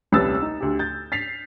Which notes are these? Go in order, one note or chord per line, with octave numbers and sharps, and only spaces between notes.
D#1 C2 C#4 B4 E6 A6
D#4
D2 G4
G6 A6
A6 B6 C7 F7